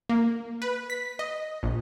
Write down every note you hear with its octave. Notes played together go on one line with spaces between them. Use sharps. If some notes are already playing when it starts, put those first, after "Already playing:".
A#3
B4
B6
D#5
A#1